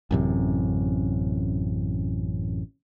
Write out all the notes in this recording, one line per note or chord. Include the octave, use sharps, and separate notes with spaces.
A1 F#2 C3